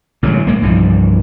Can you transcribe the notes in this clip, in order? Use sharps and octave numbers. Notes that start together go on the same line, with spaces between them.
A1 D3 F#3 G#3
A2 G#3 A#3
C2 G2 E3 F3